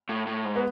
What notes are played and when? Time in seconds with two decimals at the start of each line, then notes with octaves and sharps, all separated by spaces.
0.09 A2
0.27 A2
0.45 G#2
0.56 B3